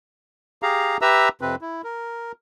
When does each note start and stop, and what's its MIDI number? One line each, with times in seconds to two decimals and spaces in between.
0.63 0.97 67
0.63 0.97 68
0.63 0.97 77
0.63 0.97 82
1.02 1.29 67
1.02 1.29 71
1.02 1.29 76
1.02 1.29 82
1.02 1.29 88
1.41 1.55 41
1.41 1.55 48
1.41 1.55 60
1.41 1.55 71
1.61 1.82 64
1.84 2.32 70